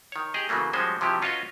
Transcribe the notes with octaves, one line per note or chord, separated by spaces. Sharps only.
D#3 C#5
G4 G#4 D#5
C#3 E3 F#3 A3 A#3
F3 G3 G#3 C#4 F#4 C5
C3 F3 F#3 E4 G4
C#4 F4 F#4 B4 C#5 D#5